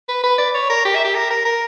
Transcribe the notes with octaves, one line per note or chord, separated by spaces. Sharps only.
B4
B4
D5
C#5
A#4
G4
E5
G4
A#4
A#4
A#4